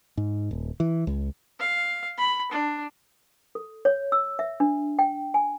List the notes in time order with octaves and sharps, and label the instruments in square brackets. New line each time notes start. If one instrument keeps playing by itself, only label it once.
[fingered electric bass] G#2
D#1
E3
C#2
[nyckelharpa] F5
B5
D4
[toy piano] A4
C#5
E6
E5
D4
G5
G#5